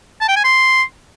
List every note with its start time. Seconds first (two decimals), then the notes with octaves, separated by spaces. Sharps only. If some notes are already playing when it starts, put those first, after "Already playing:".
0.21 A5
0.29 G5
0.36 G#5
0.44 C6